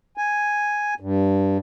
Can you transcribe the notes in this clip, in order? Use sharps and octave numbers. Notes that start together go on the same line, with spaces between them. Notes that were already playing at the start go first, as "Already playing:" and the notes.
G#5
G2